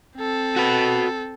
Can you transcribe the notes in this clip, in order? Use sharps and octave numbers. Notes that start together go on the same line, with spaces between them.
C4 A4
F#4 B4